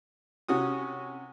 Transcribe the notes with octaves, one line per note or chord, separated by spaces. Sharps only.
C3 C#4 F#4 D#6